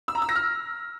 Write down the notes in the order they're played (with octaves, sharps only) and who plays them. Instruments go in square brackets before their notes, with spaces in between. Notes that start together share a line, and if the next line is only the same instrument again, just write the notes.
[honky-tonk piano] E6
A#5
E6
A#6
F6